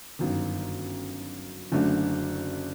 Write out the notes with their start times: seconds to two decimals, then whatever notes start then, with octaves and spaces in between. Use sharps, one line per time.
0.19 G1 F#2 D#3
1.72 F#1 F#2 D3 A3 D4